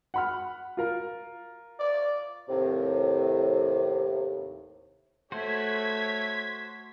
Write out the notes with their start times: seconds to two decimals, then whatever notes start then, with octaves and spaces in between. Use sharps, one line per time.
0.14 F#5 B5 F6
0.77 F4 A#4
1.80 D5
2.49 D#2 A2 C3
5.32 A3 F#4 C5 C#5 G#6 B6